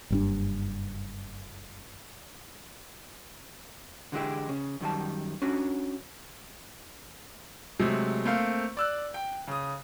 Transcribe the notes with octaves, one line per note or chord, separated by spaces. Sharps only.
F#1 G2 D4
D3 E3 G#3 B3 E4 G4
C#3
F#2 D#3 G3 A5
C#4 D4 F#4
C3 F#3 G#3 A3
A3 A#3 C4 C5 F5
D5 E6 F#6
G5
C#3 D#6